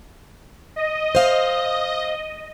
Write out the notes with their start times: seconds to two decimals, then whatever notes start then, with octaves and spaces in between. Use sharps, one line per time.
0.76 D#5
1.15 C5 F5